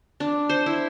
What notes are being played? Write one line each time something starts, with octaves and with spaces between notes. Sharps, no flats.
D4
C5
E4